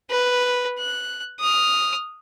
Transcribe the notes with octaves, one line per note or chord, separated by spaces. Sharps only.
B4
F#6
D#6 F6